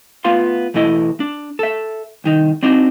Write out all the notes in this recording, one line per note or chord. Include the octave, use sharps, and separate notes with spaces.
A3 B3 F4 F5 C6
E2 B2 E3 A3 E4 D#5
D4
A4 E5
C2 D#3 D#4
C4 D4 D#4 F#4